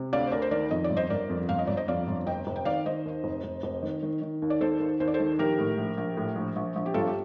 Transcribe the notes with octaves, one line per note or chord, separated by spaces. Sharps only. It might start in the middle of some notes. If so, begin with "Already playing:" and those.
Already playing: C3
D2 D5 F5
C5
D2 A#4 D5
C5
D#3 A#4 D5
F2 D#5
D5
G1
C5 D#5
G1 A#4 D5
F2
G1 F5
D#5
G1 D5
C5 D#5
F2 D5 F5
G1
F1 D#5 G5
F1
G5
D#3 D5 F5
D#3 C5 D#5
D#2
F1
F1
F1
D#3
D#3
D#3
D#2
D5
D#3 A4 C5
D#2
D#2 C5
D5
A4 C5
D#3
A#1 G4 A#4
A2
A#1
A#1
A2
A#1
A#1
A#1
G4
G1 F4 A4
G4